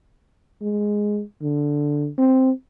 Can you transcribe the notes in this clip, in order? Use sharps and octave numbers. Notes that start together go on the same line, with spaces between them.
G#3
D3
C4